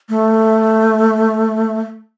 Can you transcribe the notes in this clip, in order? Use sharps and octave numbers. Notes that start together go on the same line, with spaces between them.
A3